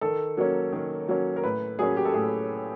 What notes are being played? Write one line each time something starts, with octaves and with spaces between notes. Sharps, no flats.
D#3 A4
F#3 A#3 C#4
D#3
F#3 A#3 C#4
A#4
A2 B4
F#3 A#3 C#4 G#4
G4
A4
A2 G#4